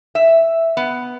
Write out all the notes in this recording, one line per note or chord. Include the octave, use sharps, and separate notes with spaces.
E5
B3